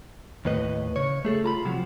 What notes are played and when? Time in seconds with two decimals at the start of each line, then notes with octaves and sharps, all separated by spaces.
0.45 D#2 A2 B4 D#5
0.96 C#3 C#5
1.25 A3 G#4 A4
1.44 F4 A#5 B5
1.65 C3 F3 F#3